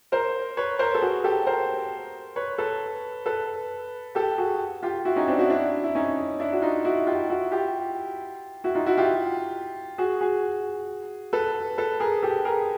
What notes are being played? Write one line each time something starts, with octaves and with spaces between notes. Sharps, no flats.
A#4 C5
B4 C#5
A#4 C5
A4
F#4 G#4
G4 A4
A#4 C5
B4 C#5
A4 B4
A4 B4
G4 A4
F#4 G#4
F4 G4
E4 F#4
C#4 D#4
C4 D4
E4 F#4
D4 E4
E4
C#4 D#4
D4 E4
F#4
D#4 F4
E4 F#4
F4 G4
E4 F#4
F4 G4
E4 F#4
D#4 F4
E4 F#4
F4 G4
F#4 G#4
F#4 G#4
A4 B4
A4 B4
G#4 A#4
G4 A4
G#4 A#4